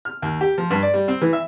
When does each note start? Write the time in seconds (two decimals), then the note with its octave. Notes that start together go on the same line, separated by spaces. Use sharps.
0.05 F6
0.22 D#2
0.41 G4
0.58 F3
0.71 G2
0.82 D5
0.94 G3
1.08 C4
1.22 E3
1.33 E5